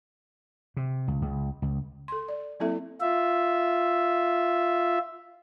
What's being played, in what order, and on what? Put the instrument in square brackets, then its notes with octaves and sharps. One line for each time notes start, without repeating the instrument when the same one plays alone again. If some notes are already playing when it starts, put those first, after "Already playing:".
[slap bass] C3
C#2
C#2
C#2
[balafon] A4 C6
D5
F#3 A#3 C4 E4 A4 E5
[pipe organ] F4 E5